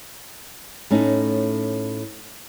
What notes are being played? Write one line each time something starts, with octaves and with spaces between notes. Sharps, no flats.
A2 A3 C#4 D#4